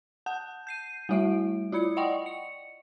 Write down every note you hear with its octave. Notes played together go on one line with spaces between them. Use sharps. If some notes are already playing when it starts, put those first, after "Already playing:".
F#5 A5 G6
G6 C7 D#7
G3 A3 E4 E5 D7
E4 F4 B5 C#7
D5 D#5 F#5 G5 C#6
C#7